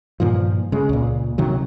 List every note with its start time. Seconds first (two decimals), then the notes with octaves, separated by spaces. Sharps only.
0.20 G2 A#2 D#3 F3
0.72 C#3 G#3
0.89 C#2 A#2
1.38 C3 D#3 F#3